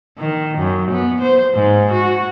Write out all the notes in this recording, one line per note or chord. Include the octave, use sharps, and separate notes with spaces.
D#3
F#2
B3
C5
G#2
F#4